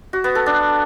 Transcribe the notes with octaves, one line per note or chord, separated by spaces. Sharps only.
F#4
B3
A4
D4